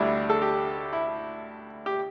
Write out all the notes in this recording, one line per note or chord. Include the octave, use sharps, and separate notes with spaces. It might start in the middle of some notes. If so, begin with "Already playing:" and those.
Already playing: D2 D3 G3 D4 E4
A4
G4
E4
G4